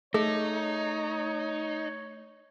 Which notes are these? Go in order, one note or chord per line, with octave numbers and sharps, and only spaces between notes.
A3 D#4 G#4 C#5